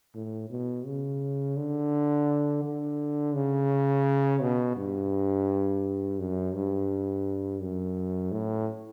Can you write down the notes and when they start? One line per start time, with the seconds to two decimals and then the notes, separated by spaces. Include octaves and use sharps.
0.15 A2
0.50 B2
0.86 C#3
1.56 D3
2.63 D3
3.34 C#3
4.41 B2
4.76 G2
6.19 F#2
6.54 G2
7.61 F#2
8.32 A2